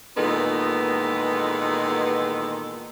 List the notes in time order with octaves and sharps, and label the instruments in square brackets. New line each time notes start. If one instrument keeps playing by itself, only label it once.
[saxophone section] A#2 D#3 E3 G#3 B3 A4